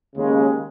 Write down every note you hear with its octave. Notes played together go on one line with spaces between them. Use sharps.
D#2 C#3 G#3